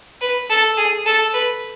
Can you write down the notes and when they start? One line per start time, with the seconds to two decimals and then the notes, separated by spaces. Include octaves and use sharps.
0.21 B4
0.49 A4
0.77 G#4
1.06 A4
1.33 B4